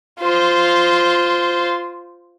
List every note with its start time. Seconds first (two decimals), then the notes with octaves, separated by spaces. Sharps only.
0.21 F4 C5